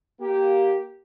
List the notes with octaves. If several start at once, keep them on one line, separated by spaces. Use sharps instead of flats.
A#3 G4